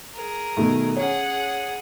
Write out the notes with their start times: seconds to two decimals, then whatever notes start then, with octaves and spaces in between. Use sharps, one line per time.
0.14 G#4 A#4
0.57 B2 D#3 A3
0.97 C#4 G#4 C#5 F#5